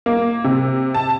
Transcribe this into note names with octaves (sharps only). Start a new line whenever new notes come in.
A#3
C3
A5